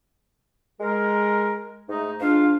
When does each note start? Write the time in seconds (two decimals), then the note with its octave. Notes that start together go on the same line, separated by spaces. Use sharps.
0.80 G#3 A#4
1.88 G#2 A3 D#4
2.21 G#2 D4 F4 F5